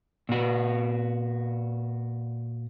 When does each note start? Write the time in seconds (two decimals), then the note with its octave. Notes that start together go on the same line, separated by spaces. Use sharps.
0.29 A#2 F#4